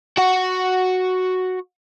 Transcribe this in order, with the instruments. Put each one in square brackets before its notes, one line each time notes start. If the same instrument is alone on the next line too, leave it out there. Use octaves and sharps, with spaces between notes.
[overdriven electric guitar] F#4 F#5